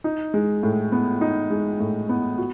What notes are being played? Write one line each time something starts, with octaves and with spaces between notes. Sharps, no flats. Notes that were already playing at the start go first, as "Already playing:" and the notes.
D#4
G#3
A2
B3
D#4
G#3
A2
B3
F#4